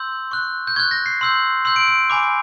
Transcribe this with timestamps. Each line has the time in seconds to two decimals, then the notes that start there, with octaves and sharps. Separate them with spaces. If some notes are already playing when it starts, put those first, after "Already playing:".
Already playing: C6 E6 G6
0.31 C#6 F#6
0.67 G6
0.76 C#6 F#6 G#6
0.91 A#6
1.06 C7
1.21 C6 E6 G6
1.65 C6 E6 G6
1.76 D7
1.88 D7
2.10 G#5 B5 D6